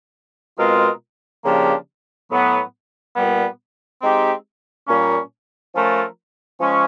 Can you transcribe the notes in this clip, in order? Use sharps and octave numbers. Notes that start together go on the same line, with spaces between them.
B2 G#3 C4 F4 A#4
C#3 F3 A#3 D4 G4
A2 F#3 B3
A#2 G3 B3
G#3 C4 D#4 G4
A#2 G3 A#3 C#4
F3 A3 C#4 F4 A#4
F3 G#3 C#4